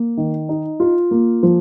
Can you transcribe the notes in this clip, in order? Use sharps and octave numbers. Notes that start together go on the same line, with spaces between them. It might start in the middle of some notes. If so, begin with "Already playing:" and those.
Already playing: A#3
D#3
D#4
F4
A#3
F3